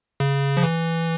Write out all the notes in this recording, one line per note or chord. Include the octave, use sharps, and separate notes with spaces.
C#3
F3
E3